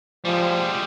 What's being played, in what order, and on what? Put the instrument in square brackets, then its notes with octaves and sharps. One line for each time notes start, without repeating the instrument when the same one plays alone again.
[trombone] F3 [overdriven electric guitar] G3 G#3